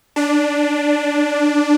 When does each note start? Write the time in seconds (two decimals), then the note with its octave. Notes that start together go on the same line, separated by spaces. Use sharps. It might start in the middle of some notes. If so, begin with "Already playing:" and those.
0.16 D4